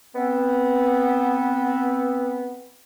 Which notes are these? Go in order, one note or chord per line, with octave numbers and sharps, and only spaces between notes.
B3 C4